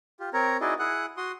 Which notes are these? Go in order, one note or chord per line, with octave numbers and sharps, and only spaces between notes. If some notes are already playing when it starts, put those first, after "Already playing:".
F4 G4
C4 A#4 C#5 A#5
D#4 E4 F#4 G#4 D5 D#5
E4 G#4 F#5 D#6 F#6
F#4 C6 D#6